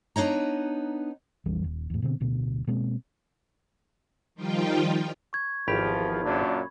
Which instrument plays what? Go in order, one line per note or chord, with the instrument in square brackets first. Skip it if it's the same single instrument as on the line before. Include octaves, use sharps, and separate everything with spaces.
[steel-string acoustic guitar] B3 D4 D#4 C#5 A#5
[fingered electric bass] A#1 F2 E3 G3
D#1
E2 A2
B2 D3 F#3 C4
D1 D2 B2
B2 G#3 A#3 C4
[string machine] D#3 F3 G3 D#4 F4 G5
[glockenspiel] C#6 G#6
[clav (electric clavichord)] G#1 G4 [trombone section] E2 F3 [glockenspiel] B5
[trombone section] F#2 A#2 D4